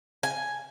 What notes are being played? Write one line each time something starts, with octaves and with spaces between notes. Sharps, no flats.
G#5